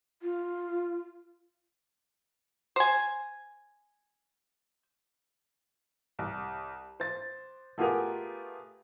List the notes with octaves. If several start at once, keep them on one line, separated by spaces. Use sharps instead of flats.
F4
C5 G#5
C2
C5 A6
A3 B3 F4 G4 G#4 A#4